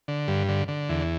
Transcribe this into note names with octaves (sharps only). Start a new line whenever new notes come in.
D3
G2
D3
D3
E2